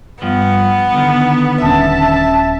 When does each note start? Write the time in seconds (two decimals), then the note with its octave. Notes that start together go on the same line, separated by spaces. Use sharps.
0.22 G2 F3 B3
0.93 D3 D#3
1.62 D#1 C#4 E5 A5